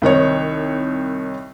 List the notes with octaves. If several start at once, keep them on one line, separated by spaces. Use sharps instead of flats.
C2 D#3 D#4 C#5